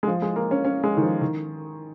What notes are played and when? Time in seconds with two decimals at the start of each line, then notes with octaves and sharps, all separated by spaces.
0.03 G#3
0.07 F3
0.22 G#3
0.36 A#3
0.51 C#4
0.65 C#4
0.84 G#3
0.97 D#3
1.02 F3
1.21 D#3